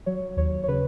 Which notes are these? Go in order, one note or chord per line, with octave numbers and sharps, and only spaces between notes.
F#3 C#5
D#2 C#5
C#5
C#3 B4